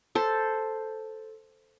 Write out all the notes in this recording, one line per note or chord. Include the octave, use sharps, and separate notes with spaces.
A4 C5